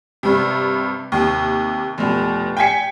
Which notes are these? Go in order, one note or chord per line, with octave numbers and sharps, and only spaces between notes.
G2 C3
D#2 C3
F1 B2
G5 G#5 G#6 B6 C#7